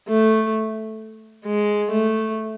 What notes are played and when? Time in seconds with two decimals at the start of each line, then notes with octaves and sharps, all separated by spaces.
0.08 A3
1.45 G#3
1.91 A3